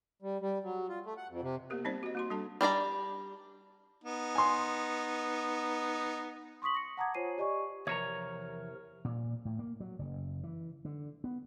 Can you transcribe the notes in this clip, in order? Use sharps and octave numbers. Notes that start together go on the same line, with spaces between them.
G3
G3
F#3
F4
A3
F#5
F2
C3
A#3 B3 G4 A#4
G3 C4 D#4 C5 D5
F#4 D#5
A#3 F#4 C6
G3 D4 A4 A5
G3 D4 D5 A#5
B3 D#4
G#5 C6
C6 C#6 D#6 B6 F#7
A#6 C#7
F#5 A5 A#5 D6 D#6 G#6
F4 C5 C#5 G#5 C7 D#7
G4 D5 D#5 G#5 C#6
E2 C3 F3 D#4 A#4 C#5 A#5 G#6
A#2
A2
A#3
F#3
F#1
E3
D3
B3